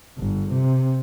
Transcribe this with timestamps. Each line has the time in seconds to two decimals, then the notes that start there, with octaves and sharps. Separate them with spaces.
0.18 G1
0.51 C3